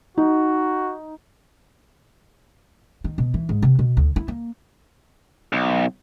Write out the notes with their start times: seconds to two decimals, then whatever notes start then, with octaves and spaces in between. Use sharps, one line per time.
0.18 D#4 F#4
3.04 D#3
3.18 B2
3.34 E3
3.49 G#2
3.62 C3
3.79 B2
3.97 D2
4.16 E4
4.28 A#3
5.53 B1